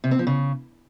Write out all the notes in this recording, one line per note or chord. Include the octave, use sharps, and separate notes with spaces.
C3
C4
F3
C#3